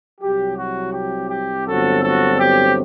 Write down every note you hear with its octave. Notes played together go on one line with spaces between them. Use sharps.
C2 C3 F#3 G4
F#4
G4
G4
G1 G2 D3 F#3 C4 F#4 A4
F#4 A4
G4